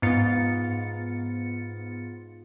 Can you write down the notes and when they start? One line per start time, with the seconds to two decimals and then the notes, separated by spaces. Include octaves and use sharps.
0.02 G#2 B3 F4 A6 C#7